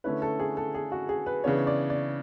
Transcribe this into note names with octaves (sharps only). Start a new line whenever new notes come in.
D3 A3 C#4 E4 B4
A4
G#4
A4
G#4
F#4
G#4
B4
C#3 E3 B3 D4 C#5
D5
D5